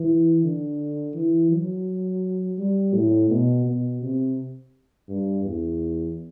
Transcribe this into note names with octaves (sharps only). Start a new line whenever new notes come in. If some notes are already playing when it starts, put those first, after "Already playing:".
Already playing: E3
D3
E3
F#3
G3
A2
B2
B2
C3
G2
E2